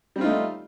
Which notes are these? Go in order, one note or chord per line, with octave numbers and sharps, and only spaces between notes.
G3 A3 C4 D#4 F4